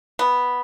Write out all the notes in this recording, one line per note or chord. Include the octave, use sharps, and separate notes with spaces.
B3